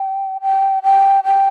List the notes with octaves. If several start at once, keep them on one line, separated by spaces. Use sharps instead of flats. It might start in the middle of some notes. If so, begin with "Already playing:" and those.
Already playing: G5
G5
G5
G5